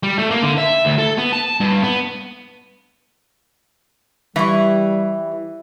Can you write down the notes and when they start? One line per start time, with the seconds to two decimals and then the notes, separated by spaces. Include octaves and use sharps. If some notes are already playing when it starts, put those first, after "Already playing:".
0.03 G3
0.19 A3
0.31 A#3
0.43 D3
0.58 E5
0.85 D2
0.98 A4
1.18 B3
1.33 A5
1.60 G2
1.83 B3
4.36 E3 G3 E4 C#6